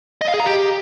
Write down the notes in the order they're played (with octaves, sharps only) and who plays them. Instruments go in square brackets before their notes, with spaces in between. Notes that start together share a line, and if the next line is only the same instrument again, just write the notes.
[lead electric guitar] D#5
F5
G#4
A#5
G4